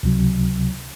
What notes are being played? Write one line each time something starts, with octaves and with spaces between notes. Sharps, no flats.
C#2 C3 F#3